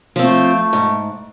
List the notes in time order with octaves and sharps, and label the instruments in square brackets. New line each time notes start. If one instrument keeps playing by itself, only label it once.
[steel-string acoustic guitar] F3 C4 [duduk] A3
[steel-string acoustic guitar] G#2